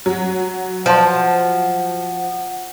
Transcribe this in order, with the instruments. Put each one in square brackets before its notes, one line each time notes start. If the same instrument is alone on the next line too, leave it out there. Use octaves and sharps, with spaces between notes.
[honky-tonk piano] F#3 [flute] F#5
[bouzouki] F3 [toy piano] C5 A5 C6